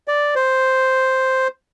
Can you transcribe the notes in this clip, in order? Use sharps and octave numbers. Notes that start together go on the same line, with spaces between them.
D5
C5